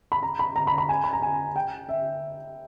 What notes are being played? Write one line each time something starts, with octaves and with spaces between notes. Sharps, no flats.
B5
A#5
B5
A#5
B5
B5
G#5
B5
A#5
G#5
G5
E5